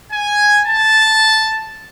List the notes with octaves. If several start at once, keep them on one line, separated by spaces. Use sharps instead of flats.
G#5
A5